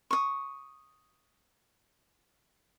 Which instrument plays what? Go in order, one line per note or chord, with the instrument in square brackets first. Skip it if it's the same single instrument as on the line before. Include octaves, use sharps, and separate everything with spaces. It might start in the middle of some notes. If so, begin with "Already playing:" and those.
[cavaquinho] C#6 D#6